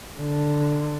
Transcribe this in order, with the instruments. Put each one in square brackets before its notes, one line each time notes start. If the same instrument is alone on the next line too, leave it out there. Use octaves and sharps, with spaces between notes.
[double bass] D3